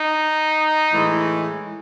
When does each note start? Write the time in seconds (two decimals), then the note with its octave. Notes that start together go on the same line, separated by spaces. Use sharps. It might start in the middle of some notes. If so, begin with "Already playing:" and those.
Already playing: D#4
0.92 A2 E3 G#3